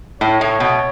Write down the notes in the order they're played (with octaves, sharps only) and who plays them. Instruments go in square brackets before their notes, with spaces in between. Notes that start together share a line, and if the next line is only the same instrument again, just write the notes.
[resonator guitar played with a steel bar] A2 [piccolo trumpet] C#5
[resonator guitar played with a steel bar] A2
B2